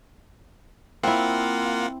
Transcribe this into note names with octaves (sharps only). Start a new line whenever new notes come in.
A#3 C4 E4 F4 F#5